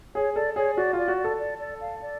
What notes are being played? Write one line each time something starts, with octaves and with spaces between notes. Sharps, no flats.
G#4 C#5
A4 D5
G#4 C#5
F#4 D5
F4
D5
F#4
D5
A4
D5
D5
F5
D5